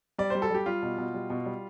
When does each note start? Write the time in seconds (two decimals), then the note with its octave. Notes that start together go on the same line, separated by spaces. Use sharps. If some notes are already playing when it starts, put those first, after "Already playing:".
0.18 G3 D5
0.30 G3 C5
0.42 A4
0.51 G3 G4
0.66 G3 F4
0.83 B2
0.98 B2
1.14 G3
1.30 B2
1.46 G3